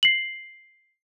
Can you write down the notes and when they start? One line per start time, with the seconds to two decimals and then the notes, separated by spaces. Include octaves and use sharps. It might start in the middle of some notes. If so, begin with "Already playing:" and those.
0.03 C7 F#7